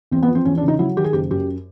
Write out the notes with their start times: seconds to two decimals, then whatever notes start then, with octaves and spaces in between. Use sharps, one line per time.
0.11 E2 C4
0.23 B3
0.28 F3
0.35 C4
0.45 E2 C#4
0.58 D4
0.63 C#3
0.68 D#4
0.79 F#3 E4
0.97 D#3 G4
1.04 G#4
1.13 F#1 G4
1.30 F#2 G4